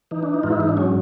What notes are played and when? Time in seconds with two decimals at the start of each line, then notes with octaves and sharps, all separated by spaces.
0.11 E3 D#4
0.23 D4
0.34 D#4
0.43 G#2 F4
0.52 E4
0.60 D#4
0.69 D4
0.77 F#3 C#4